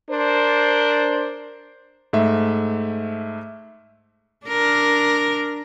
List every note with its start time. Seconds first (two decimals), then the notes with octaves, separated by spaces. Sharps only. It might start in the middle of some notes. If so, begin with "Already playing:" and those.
0.11 D4 A#4 C5
2.13 G#2 A3 E5
4.46 D4 A#4